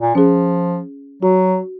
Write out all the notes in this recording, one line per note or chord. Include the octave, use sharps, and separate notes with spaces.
A#2
F3 C#4 G#4
F#3 F#4